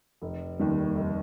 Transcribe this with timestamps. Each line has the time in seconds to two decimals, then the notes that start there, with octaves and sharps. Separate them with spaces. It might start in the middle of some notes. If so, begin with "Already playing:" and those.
0.22 F1
0.59 D#2 D#3 G3
0.95 F1